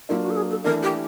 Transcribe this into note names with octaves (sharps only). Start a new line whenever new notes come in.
F#3 A#3 D4 E4 F4
F#4
A4
G#4
A4
E3 A3 D4 A#4
G4